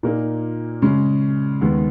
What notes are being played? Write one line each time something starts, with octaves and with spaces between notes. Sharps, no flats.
A#2 A#3 D#4
C#3 G#3 C#4
D#2 D#3 G#3 B3